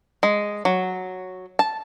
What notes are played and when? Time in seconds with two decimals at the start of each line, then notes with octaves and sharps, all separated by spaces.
0.23 G#3
0.65 F#3
1.59 A5